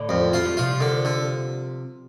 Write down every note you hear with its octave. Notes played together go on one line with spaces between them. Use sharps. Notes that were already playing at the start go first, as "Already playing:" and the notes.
Already playing: A2 D3
F2
F3 F4
G3
C3 F3 F4
D3
D3